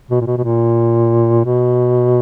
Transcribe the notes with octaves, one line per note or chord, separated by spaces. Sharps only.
B2
A#2
B2
B2
A#2
B2